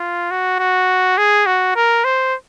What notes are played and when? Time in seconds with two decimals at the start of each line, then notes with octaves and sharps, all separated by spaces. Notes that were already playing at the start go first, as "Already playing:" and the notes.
Already playing: F4
0.31 F#4
0.59 F#4
1.18 G#4
1.46 F#4
1.76 A#4
2.04 C5